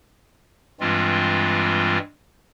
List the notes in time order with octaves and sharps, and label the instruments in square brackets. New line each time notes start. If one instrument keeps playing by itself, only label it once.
[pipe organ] G2 E3 G3 G#3 C4 F4